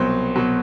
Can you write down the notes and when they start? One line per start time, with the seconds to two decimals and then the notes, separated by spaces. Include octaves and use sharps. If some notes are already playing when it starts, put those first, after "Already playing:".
Already playing: C2 B2 F#3 C5
0.36 B2 F#3